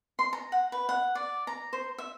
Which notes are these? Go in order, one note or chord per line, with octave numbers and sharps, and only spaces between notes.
C6
A#5
F#5
B4
F#5
D5
A#5
C5
E5